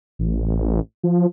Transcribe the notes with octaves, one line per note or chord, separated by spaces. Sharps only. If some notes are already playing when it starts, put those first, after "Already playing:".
A1
F3